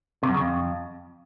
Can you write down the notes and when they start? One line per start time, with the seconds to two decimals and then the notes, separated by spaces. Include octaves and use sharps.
0.23 C3
0.29 F#2
0.34 C#3
0.40 F2